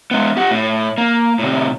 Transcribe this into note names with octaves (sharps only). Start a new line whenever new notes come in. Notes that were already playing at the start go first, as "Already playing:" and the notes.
G#3 B3
G4 F#5
A2
A#3
A2 C3